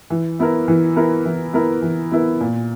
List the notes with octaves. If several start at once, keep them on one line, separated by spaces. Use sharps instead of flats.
E3
B3 E4 A#4
E3
B3 E4 A#4
E3
B3 E4 A#4
E3
B3 E4 A#4
A#2